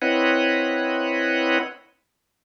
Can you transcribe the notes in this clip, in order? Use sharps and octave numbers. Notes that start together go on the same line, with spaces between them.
C4 E4 B4 C#5 D#5 F#5